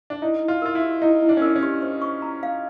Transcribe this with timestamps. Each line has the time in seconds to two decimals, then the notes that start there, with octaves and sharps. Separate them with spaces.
0.10 D4
0.22 D#4 E4
0.42 E4
0.48 F4
0.62 F4 A#4
0.75 E4
0.81 G4
1.02 D#4 E4
1.22 E4
1.29 D4
1.37 C#4
1.41 D4 A#4
1.55 C#4
1.63 G4
1.82 C5
2.02 C#6
2.22 A#5
2.43 F5